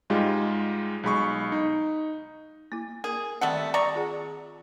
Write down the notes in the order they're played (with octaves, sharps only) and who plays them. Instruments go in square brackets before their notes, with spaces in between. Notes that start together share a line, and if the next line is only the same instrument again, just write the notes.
[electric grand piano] G#2 G3 G#3 F4 G4
B1 G#3 B5 C#6
D#4
[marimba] A#3 E4
[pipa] G#4 [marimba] A#4
[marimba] D#3 C4 E6 [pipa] G3 A3 F#5
[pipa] D5 A#5 C#6 [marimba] D#6
[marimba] F4 G#4 F#5